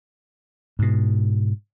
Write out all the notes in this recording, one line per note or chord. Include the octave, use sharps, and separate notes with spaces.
G#2 B2